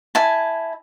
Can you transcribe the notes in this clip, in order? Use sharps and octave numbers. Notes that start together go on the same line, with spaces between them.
E4 G#5 A5